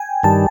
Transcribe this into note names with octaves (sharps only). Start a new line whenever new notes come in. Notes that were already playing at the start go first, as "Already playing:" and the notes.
Already playing: G5 G#5
G2 D#3 G3 A5